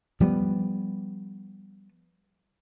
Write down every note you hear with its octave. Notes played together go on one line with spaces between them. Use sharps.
F3 G3 A3 B3